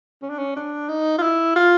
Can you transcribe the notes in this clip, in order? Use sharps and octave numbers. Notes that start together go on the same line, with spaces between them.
C#4
D4
C#4
D4
D#4
F4
E4
F4